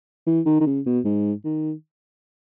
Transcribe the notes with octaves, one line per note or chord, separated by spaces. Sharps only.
E3
D#3
D#3
C#3
B2
G#2
D#3